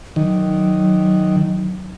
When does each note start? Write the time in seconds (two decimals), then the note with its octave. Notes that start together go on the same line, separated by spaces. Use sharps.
0.16 D#3 F#3